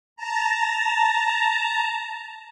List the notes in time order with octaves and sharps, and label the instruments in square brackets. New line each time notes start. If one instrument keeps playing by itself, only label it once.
[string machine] A5 A#5